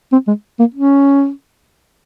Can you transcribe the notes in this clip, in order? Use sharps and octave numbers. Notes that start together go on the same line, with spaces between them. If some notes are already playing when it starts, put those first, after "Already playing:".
C4
G#3
A#3
C#4